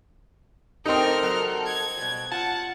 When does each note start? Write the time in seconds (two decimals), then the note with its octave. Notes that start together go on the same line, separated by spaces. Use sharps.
0.86 C4 D#4 G4 A4 A#4 D5 G5 F6
1.23 F#3
1.66 G#6
1.97 B2 G3
2.32 F4 F#5 A5